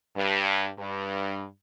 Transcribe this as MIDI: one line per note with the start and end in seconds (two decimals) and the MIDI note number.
0.16 0.68 43
0.79 1.44 43